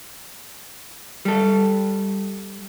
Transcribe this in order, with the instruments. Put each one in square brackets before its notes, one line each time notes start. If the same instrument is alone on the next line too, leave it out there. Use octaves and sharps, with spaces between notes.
[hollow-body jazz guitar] G3 A4